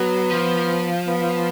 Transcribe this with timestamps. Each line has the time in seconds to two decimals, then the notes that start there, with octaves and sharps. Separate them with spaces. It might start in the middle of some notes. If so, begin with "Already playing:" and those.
Already playing: F#3 B3
0.30 F3
1.07 B3